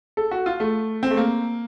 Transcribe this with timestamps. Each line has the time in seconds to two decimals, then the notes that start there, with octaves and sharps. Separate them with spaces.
0.17 A4
0.31 F#4
0.46 F4
0.60 A3
1.03 C4
1.11 A3
1.17 A#3